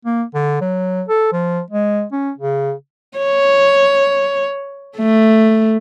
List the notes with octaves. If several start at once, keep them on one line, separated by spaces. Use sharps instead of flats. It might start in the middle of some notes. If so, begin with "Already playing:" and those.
A#3
D3
F#3
A4
F3
G#3
C#4
C#3
C#5
A3